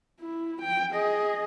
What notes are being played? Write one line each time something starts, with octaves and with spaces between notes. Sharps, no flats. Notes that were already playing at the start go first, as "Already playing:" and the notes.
E4
G5
G#4 D#5